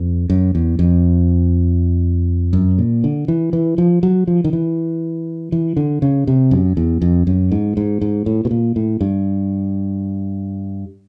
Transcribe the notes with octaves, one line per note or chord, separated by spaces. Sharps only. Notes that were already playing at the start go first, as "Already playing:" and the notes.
Already playing: F2
F#2
E2
F2
F#2
A#2
D3
E3
E3
F3
F#3
F3
D#3
E3
E3
D3
C#3
C3
F#2
E2
F2
F#2
G#2
G#2
G#2
A2
B2
A#2
A2
G2